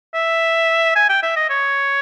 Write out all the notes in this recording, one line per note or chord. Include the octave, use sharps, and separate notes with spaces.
E5
G#5
G5
E5
D#5
C#5